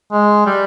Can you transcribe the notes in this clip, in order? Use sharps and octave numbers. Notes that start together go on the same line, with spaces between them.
G#3
G3